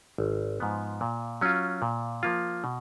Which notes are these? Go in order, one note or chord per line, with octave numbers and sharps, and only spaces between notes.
G#1
G#2 F3 B3
A#2
F#3 C#4 F4
A#2
F3 A#3 F4
B2